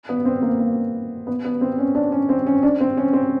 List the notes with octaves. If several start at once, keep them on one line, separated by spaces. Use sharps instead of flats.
B3
C4
A#3
A#3
B3
B3
C4
C#4
D4
C#4
C4
C#4
D4
C4
C#4
C4